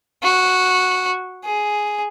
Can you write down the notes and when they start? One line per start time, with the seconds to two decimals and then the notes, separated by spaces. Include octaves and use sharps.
0.23 F#4
1.44 G#4